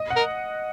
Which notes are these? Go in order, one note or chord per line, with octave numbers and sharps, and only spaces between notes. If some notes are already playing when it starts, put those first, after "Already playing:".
Already playing: D#5
F#5
A#4